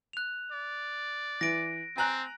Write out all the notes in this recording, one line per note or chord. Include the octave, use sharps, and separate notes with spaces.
F#6 F7
D5
E3 A#6 D7
C4 G#5 A#5 F#6